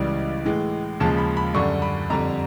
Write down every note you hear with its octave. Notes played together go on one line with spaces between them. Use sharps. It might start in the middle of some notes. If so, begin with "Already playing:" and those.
Already playing: C#2 C#3 E3 G3
A2 E3 G#3
D#2 C#3 F3 G#3 A5
B5
B5
F#2 D3 G3 C#6
B5
F2 D3 G3 A#5